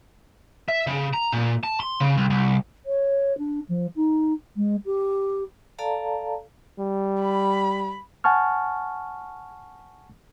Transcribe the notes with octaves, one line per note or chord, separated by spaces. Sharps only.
E5
C#3
A#5
A#2
A5
C6
C#3
C2
C2
C#5
D4
F3
D#4
G#3
G4
A4 D5 F5 A5 A#5
G3
B5
F#5 G#5 A5 C#6 F6